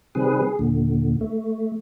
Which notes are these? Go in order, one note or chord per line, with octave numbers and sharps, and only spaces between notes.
C3 D#3 G3 C4 G#4 B4
G#4
D#2 A#2 D3
A3